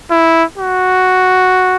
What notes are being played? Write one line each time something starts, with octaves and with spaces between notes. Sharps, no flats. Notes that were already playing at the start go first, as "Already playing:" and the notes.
E4
F#4